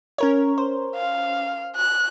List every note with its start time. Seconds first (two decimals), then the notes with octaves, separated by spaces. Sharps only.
0.18 C#4 A#4 C#5
0.58 C5
0.95 F5
1.76 F#6